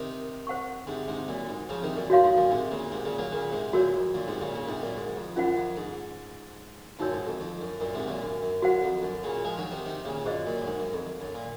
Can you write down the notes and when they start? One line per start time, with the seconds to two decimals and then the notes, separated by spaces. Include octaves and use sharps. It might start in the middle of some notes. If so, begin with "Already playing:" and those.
Already playing: C3 D#3
0.47 C5 F#5 C#6
0.87 G#2 C3
1.08 G#2 C3
1.28 F#2 A#2
1.49 G#2
1.69 C#3 F3
1.82 C3 D#3
1.96 F#2 A#2
2.10 F#2 F#4 C#5 F5 C6
2.24 G#2
2.37 F#2 A#2
2.51 G#2 C3
2.71 A#2 C#3
2.92 G#2 C3
3.05 A#2 C#3
3.19 F#3 A#3
3.32 A#2 C#3
3.52 G#2 C3
3.72 F#2 A#2 F#4 A#4 C#5
3.94 F2
4.14 F#2 A#2
4.27 G#2 C3
4.41 A#2 C#3
4.54 A#2 C#3
4.68 G#2 C3
4.82 F#2 A#2
4.96 G#2
5.16 F2
5.36 F#2 C#4 F4 C5 F#5
5.57 F2
5.77 G#2
6.99 F#2 A#2 D#4 F#4 A#4 C#5
7.13 G#2
7.26 F2
7.40 F2
7.61 F#2
7.80 F#2 A#2
7.94 G#2 C3
8.08 F#2 A#2
8.22 F#2
8.42 F#2
8.62 F#2 F#4 C5 F#5
8.82 F2
9.03 F#2
9.23 A#2 C#3
9.44 F3 G#3
9.57 D#3 F#3
9.71 C3 D#3
9.85 C3 D#3
10.05 A#2 C#3
10.25 F#2 A#2 G#4 C5 D#5
10.46 F#2 A#2
10.61 F#2
10.67 G#2
10.79 F#2
10.93 F2
11.21 F#2
11.35 A#2